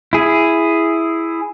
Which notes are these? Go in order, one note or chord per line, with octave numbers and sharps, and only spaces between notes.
E4 G#4